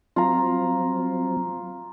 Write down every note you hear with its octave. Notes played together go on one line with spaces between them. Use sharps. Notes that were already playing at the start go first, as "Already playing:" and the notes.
F#3 C4 F4 A#5